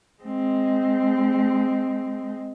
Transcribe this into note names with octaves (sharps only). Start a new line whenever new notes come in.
G#3 C4